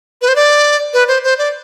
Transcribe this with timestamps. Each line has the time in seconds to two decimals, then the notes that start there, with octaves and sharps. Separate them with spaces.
0.21 B4
0.28 C5
0.36 D5
0.93 B4
1.08 C5
1.24 C5
1.38 D5